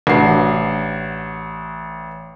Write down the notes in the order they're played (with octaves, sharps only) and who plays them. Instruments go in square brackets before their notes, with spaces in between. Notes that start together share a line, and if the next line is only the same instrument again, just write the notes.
[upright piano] A1 D4 F#4 C7